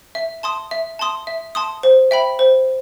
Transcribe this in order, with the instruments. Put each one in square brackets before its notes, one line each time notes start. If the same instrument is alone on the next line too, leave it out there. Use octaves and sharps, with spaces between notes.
[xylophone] E5
A5 C6 D#6
E5
A5 C6 D#6
E5
A5 C6 D#6
C5
E5 G5 B5
C5